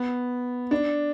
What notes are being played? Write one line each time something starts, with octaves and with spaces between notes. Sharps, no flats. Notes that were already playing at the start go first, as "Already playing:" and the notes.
Already playing: B3
D4